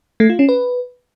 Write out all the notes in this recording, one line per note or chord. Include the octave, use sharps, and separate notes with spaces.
A3
F4
C#4
B4